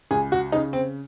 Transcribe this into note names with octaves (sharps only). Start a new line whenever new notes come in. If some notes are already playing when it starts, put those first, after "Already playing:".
C#2 G#4
F#4
C#3 D#4
C4